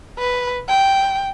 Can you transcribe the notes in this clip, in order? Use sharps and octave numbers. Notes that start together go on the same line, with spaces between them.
B4
G5